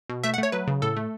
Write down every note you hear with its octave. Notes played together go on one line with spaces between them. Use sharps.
B2
A3 E5
F#5
A3 C#5
F#3 B4
C#3
A2 A4
A3